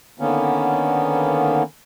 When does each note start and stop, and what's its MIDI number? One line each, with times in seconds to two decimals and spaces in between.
0.19 1.63 50
0.19 1.63 51
0.19 1.63 58
0.19 1.63 59
0.19 1.63 61